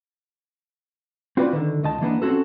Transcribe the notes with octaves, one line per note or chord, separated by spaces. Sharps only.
C4 F4 F#4 B4 D5
D3 D#3
C#2 D#5 A5
E3 A#3 B3 D4
C4 C#4 F4 F#4 A4